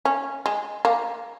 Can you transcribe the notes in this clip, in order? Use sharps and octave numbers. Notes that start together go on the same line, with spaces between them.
C#4
G#3
A#3